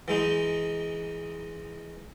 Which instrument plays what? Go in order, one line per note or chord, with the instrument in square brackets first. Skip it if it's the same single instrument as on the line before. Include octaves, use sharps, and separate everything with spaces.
[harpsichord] E3 G#3 D#4